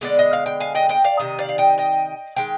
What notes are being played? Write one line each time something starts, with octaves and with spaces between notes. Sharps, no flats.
D3 G#3 B3 D5
D#5
F5
G5
F5 G#5
D#5 G5
D#5 G5
D5 F5
C3 D#3 D#5
D5 F5
F5
D#5 G5
D#5 G5
D#3 G#3 G5